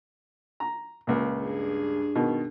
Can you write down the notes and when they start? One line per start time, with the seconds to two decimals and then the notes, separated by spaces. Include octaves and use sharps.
0.60 A#5
1.07 C#2 A#2
1.42 G2 D4 G#4
2.15 B2 D#3